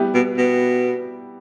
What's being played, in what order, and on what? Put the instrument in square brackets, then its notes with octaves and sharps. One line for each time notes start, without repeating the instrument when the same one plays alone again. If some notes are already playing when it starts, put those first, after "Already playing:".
Already playing: [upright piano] G3 B3 E4 G4
[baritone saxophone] B2
B2